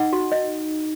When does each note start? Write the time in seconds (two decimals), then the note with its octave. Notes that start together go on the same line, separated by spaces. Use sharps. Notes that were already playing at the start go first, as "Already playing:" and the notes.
Already playing: D#4 F#5
0.13 F#4
0.32 D#5